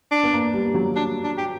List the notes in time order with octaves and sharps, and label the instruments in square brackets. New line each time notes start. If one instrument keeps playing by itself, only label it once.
[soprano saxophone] D4
[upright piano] B3
A#3
G3
F#3
[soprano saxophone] D4
D4
G4